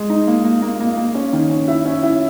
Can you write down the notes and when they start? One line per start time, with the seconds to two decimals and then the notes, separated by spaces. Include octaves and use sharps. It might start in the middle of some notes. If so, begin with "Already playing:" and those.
Already playing: G#3
0.10 D#4
0.27 A#3
0.44 A#3
0.62 A#3
0.80 A#3
0.97 A#3
1.14 C#4
1.33 D#3
1.49 C#4
1.68 E4
1.85 C#4
2.03 E4